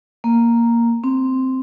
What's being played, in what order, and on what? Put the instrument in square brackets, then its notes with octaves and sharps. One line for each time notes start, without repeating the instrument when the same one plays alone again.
[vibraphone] A#3
C4